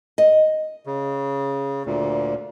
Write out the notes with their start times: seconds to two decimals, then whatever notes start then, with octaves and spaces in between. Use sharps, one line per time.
0.18 D#5
0.86 C#3
1.86 D2 A#2